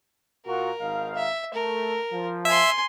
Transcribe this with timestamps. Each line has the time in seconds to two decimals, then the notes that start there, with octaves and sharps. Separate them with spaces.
0.46 A#2 A#3 F#4 A#4
0.80 G#1 D#4 F5
1.15 E5
1.54 A3 A#4
2.11 F3
2.45 E5 G#5 C6